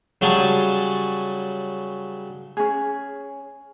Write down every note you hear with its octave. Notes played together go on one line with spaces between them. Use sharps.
C#3 F#3 G3 G#5 A5
C#4 G#4